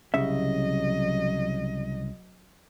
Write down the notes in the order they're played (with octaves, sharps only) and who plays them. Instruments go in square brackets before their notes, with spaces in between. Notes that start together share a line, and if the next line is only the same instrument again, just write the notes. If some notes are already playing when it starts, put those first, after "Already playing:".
[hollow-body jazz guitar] C2 C#3 E5 [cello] F#3 D#5